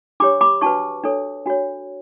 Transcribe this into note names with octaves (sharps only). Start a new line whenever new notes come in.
D4 G4 C#5 B5 D6
B5 D6
D4 F#4 B4 A5 C#6
D4 A4 C#5
D4 F#4 C#5